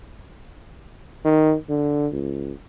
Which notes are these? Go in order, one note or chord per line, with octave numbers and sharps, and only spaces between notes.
D#3
D3
C#2